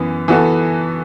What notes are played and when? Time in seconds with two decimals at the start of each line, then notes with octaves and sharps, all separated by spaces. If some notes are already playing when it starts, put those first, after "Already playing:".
Already playing: F#2 E3 B3
0.28 E3 B3 F#4 A4